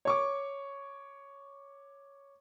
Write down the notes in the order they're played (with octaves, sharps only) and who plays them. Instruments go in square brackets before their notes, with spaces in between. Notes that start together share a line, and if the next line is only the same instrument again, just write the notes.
[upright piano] C#5 C#6 D6